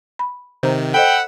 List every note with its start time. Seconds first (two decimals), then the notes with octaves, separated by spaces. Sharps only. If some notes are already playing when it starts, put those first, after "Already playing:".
0.19 B5
0.63 C3 D#3 C5 A#5
0.94 A4 C5 D#5 F#5 G5 B5 E6